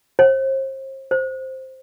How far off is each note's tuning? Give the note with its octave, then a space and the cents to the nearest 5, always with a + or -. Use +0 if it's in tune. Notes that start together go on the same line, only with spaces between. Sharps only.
C5 +35
C5 +5